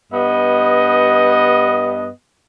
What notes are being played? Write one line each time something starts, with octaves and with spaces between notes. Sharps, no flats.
G2 B3 D#5